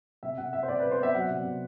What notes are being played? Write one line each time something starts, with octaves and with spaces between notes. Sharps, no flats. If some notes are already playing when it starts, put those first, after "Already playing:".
C3 E5
C3 F#5
C3 E5
C5
C3 D5
C3 B4
C5
B3 E5
F#3 F#5
C3
C3